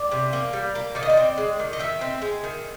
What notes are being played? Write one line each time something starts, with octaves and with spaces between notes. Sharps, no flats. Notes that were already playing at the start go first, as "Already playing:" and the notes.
Already playing: D5
C3
A#3
G3
A#3
D#3 D5
D#5
D5
C4
G#3
D#3
D#5
D#3 E5
C4
G#3
D#3